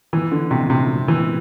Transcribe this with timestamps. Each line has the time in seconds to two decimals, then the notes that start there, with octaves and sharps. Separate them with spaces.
0.13 E3
0.31 D3
0.51 C3
0.70 C3
1.08 E3